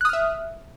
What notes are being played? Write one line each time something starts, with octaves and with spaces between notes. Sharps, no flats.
E5 D#6 F6 F#6